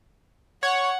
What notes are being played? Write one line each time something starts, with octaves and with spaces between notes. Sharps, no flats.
C#5 F#5